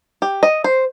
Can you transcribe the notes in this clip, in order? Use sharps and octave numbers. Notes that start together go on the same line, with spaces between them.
G4
D#5
C5